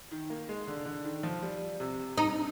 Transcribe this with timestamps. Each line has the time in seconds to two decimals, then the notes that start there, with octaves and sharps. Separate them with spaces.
0.11 D#3
0.30 A#3
0.49 G#3
0.67 D3
0.85 D3
1.05 D#3
1.23 F3
1.43 G3
1.80 C3
2.18 D#4